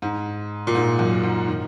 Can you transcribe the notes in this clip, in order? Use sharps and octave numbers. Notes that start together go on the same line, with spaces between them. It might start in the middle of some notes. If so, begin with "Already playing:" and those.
G#2
A#2
G#2
F#2
G#2
D#3